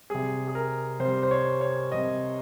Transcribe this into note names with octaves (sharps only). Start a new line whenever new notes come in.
C3 G3 G#4
G#4
A#4
C3 G3 C5
C5
C#5
C#5
C3 G3 D#5